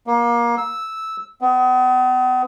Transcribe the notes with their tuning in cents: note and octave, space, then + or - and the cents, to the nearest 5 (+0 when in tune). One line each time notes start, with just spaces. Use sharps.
A#3 +25
E6 -10
B3 +40